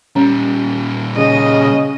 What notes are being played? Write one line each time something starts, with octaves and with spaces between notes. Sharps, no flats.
A#2 G3 C#4
C#3 D#5